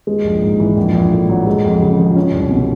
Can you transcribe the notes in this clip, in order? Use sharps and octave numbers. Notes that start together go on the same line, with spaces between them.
G#3
A#1
G#2
E3
A#1
A#1
A2
F#3
G#3
F2
C#3
F3
C#4
C2
B2